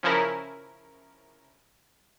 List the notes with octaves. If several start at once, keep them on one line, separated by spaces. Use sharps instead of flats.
C#3 F3 C#4 E4 A#4